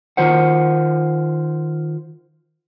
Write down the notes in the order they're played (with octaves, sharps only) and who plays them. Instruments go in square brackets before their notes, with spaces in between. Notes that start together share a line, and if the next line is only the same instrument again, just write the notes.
[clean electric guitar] D#3 F4 C5 F#5